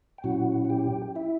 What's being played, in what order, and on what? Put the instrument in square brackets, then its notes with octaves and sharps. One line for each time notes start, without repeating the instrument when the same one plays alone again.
[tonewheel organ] G5
A#2 F#3 C#4 E4 F#4 F#5
F#5
G4 G5
E4 E5